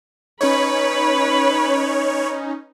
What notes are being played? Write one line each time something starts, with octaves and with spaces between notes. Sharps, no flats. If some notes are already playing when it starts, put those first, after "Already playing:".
C#4 D#4 B4 C#5 B5